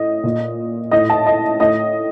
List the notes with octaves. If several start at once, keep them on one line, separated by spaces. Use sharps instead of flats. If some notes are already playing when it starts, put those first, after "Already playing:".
Already playing: A2 D#5
A#2
A2 D#5
A5
D#5
A2 D#5